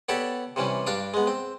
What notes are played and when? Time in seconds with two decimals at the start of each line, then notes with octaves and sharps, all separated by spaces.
0.09 B3 G4 A4 C#5 D5
0.56 C3 E3 G3 C#4
0.87 G2 D4 F5 D6
1.14 G#3 B3
1.27 C4